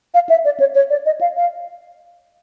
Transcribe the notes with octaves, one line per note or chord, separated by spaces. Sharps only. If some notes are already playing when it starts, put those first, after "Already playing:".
F5
E5
D5
C#5
C#5
D5
D#5
F5
F5